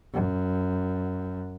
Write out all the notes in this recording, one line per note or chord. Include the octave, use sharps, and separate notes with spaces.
F#2